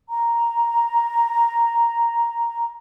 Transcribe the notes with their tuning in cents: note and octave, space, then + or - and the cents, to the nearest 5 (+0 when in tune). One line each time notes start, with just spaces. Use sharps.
A#5 +0